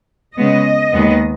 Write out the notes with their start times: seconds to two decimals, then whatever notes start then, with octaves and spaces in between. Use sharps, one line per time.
0.36 C#3 G#3 B3 D#5
0.92 D#2 D#3 G#3 B3